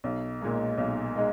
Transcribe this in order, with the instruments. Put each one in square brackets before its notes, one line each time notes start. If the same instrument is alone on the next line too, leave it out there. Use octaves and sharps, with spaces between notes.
[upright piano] B1
A#2 G#3 D#4
B1
G#3 D#4